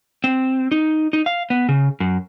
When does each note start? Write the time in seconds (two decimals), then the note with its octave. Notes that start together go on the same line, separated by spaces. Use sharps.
0.24 C4
0.72 D#4
1.13 D#4
1.26 F5
1.50 B3
1.69 C#3
2.00 F#2